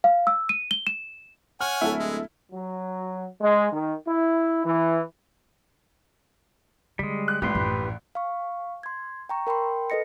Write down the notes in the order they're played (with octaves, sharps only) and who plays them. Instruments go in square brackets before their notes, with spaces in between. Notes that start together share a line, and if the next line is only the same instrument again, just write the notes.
[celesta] F5
E6
D#7
G7
E7
[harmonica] C#5 F#5 G#5 [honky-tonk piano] F6
[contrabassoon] D1 [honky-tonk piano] E4 A4
[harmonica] G#3
[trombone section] F#3
G#3
D#3
E4
E3
[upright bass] D3 [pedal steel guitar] G3 G#3
[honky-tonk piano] F#6
[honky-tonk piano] A#1 A2 [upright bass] G#3 [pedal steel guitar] G4 B4 C6
[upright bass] A1 F#2
[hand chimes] F5 C#6
C6 G#6
G5 A#5 C#6
A#4 G5 B5 C6
A4 B4 D#5 A#6 C#7